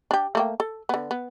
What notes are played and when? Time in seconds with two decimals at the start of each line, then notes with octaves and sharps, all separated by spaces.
0.11 D4 G4
0.35 A3 A#3 G5
0.60 A4
0.89 D3 B3
1.11 B3